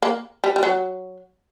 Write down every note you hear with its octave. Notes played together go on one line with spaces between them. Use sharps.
A#3
G3
G3
F#3